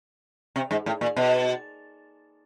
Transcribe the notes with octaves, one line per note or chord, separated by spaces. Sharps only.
C3
G#2
A2
A#2
B2